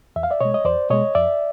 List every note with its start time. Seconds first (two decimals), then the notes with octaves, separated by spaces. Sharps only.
0.16 E2 E5
0.23 F5
0.31 D5 E5
0.41 B2 G#3 C#5 D#5
0.54 D#5
0.65 E2 C5 D5
0.90 B2 G#3 C#5 D#5
1.15 F2 D5 E5